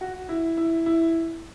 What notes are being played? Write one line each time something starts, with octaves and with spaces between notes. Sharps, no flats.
F#4
E4
E4
E4